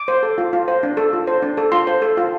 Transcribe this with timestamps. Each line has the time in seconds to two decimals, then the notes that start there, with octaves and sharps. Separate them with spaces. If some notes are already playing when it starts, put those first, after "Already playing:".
Already playing: D6
0.08 C5
0.23 A4
0.38 F4
0.53 F4
0.68 C5
0.83 D4
0.97 A4
1.13 F4
1.27 C5
1.42 D4
1.58 A4
1.72 F4 C6
1.87 C5
2.02 A4
2.17 F4